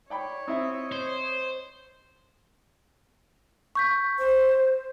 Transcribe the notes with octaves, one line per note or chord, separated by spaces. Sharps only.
C#5 D5 G5 B5
C4 E4 D#5 E5
C5
C#6 G6 B6
C5